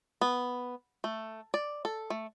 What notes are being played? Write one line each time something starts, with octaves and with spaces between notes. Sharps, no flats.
B3
A3
D5
A4
A3